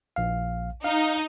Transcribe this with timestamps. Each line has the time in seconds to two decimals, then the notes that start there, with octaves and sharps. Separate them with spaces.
0.16 A#1 F5
0.84 D#4 F5